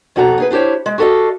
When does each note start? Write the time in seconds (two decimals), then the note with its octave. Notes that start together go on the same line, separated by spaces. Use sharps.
0.16 F2 B2 F#4 A4 G#5 A#5
0.38 D#4 G#4 B4
0.51 D4 E4 G4 C5 C#5
0.86 G#3
0.98 F#4 G4 A4 D#5 F5